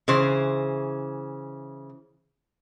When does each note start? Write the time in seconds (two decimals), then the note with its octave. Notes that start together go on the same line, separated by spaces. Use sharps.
0.08 C#3 E3 C5